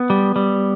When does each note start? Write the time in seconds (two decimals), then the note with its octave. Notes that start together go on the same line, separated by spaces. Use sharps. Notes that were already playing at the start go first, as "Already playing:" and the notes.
Already playing: B3
0.10 G3
0.36 G3